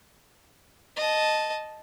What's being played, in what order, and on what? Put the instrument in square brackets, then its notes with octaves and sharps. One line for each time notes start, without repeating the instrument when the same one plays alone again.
[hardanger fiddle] D#5 A5